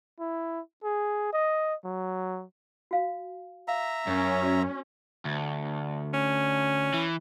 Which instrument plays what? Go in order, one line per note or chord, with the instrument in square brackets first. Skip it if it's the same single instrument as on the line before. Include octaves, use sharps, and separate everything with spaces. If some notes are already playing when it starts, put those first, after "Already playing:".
[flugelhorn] E4
G#4
D#5
F#3
[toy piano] F#4 F5
[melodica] E5 A#5 [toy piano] F5
[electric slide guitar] F#2 [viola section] C#4
[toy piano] F#4 D5
[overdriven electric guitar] D2
[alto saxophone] C#4
[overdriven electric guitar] E3